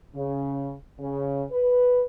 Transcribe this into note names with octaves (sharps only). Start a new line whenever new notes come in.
C#3
C#3
B4